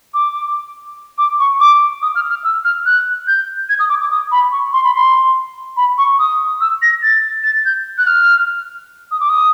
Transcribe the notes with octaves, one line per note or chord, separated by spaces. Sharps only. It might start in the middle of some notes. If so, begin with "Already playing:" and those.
D6
D6
C#6
D6
D#6
F6
F6
E6
F6
F#6
G6
G#6
D#6
D6
D6
D#6
B5
C#6
C6
B5
C6
B5
C#6
D#6
E6
A#6
A6
A6
G6
F#6
F6
D#6
D6
D#6